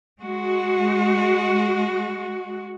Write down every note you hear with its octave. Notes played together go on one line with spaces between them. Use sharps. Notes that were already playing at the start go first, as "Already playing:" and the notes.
G#3 F#4